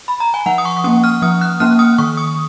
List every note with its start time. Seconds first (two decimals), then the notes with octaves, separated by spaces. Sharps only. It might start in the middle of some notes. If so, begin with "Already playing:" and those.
0.08 B5
0.20 A#5
0.34 G#5
0.46 F3 F#5
0.58 D#6
0.65 C#6
0.77 C#6
0.84 A#3 C#4 D#6
1.04 F6
1.22 F3 D#6
1.41 F#6
1.60 A#3 C#4 F6
1.79 D#6
1.98 D#3 C#6
2.17 D#6